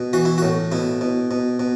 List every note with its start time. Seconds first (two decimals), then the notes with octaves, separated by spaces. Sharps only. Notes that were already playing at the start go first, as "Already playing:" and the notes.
Already playing: B2
0.13 E3 F#4
0.25 E4
0.38 A2 F#4
0.72 B2 E4
1.01 B2
1.31 B2
1.60 B2